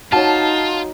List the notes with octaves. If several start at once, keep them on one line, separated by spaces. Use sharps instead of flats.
D#4 F4 F#4 C#5 A5